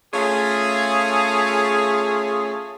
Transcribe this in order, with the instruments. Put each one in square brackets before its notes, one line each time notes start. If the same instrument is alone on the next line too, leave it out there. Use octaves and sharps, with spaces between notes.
[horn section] A3 C#4 F4 G#4